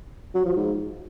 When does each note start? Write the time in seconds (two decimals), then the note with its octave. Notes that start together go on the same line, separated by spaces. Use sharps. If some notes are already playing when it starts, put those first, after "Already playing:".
0.35 F#3
0.45 F3
0.56 G#2